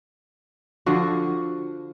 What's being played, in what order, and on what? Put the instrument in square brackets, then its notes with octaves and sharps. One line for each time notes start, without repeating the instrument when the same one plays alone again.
[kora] D3 F3 F#4